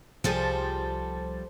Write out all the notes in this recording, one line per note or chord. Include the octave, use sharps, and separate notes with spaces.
C2 F3 G3 G#4 A4 C5 A6